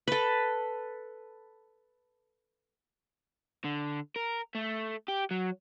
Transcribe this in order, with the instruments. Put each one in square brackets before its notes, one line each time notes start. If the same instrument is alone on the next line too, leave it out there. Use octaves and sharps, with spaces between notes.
[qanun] A4 B4
[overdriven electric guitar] D3
A#4
A3
G4
F#3